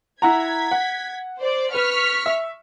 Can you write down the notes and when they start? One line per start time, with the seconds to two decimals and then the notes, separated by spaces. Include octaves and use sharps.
0.22 E4 F#5 A#5 G#6 B6
0.71 F#5
1.38 C5 D5
1.74 B4 C#6 F6 B6
2.26 E5